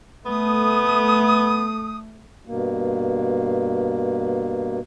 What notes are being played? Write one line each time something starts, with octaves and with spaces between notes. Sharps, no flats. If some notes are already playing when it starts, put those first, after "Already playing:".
A3 B3 D#6
G2 B2 A#3